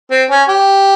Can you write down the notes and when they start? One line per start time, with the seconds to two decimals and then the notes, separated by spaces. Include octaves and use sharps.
0.11 C4
0.30 C#4
0.48 G4